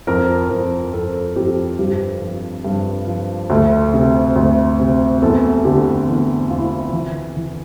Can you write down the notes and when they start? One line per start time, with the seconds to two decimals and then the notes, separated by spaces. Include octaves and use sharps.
0.07 F2 A#4
0.49 F2 A#4
0.93 F2 A4
1.36 F2 G4
1.79 G2 G4
2.21 F3
2.65 G2
3.07 F3
3.50 D2 A4
3.94 C3
4.36 D2
4.79 C3
5.22 E2 A4
5.65 D3 G4
6.07 E2
6.50 E2 F4
6.58 E4
6.66 F4
6.93 E3
7.37 E3